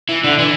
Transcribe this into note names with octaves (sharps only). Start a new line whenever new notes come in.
E3
D3
E3